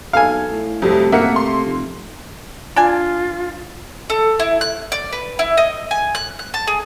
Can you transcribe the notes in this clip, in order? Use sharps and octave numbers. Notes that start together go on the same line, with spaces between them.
B1 A4 F5 G#5
A2
F2 C3 F#3 G3 A3 C4
A3 A#3 E5 F#5 C#7
C6
F1
D4 F4 G#5
A4
E4
F#6
D5
B4
E4
D#5
G#5
F#6
F#6
A5
G#4